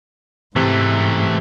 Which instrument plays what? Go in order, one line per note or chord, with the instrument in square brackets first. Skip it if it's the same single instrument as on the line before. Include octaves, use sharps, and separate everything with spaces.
[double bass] G#2 [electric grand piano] C3 [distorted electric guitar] E3 A3